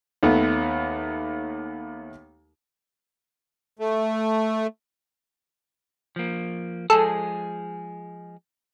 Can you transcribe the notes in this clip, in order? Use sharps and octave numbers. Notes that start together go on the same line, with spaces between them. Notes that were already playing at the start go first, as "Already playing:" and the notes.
D#2 A3 B3
A3
F3 A#3
F3 G#3 G#4 A4